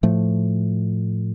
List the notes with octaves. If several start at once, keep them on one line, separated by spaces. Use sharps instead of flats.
A2 F3 A3